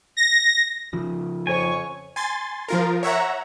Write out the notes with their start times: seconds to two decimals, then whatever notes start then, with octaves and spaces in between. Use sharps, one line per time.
0.17 A#6
0.93 C#3 F3
1.47 F2 C#5 G#5 C#6
2.16 G#5 C6 A6
2.68 F3 F4 A#4
3.03 C#5 E5 F#5 A#5